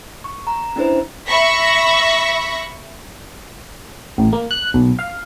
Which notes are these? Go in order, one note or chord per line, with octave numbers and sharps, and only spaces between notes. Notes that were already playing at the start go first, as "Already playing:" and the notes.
C#6
A#5
C#4 D4 E4 B4 C5
E5 B5 C#6 A#6 B6
A1
A#3
F#6
B1
F5